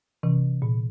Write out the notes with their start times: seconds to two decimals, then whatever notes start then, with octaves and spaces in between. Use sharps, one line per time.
0.23 C3 E3 C#4
0.62 A#2